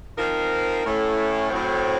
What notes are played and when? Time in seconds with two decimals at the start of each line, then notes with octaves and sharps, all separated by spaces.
0.18 F3 C4 D#4 A#4
0.84 A2 A3 C#4
1.50 A2 F#3 C4